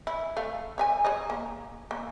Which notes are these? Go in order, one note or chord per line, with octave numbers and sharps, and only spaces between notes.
E4
A3 F5
C#5 E5 G#5
G#4 C#5 D#5
A#3
A#3